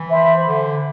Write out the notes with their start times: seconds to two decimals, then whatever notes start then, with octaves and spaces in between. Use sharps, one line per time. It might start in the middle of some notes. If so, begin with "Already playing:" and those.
Already playing: E3
0.10 C5 E5 B5
0.46 D3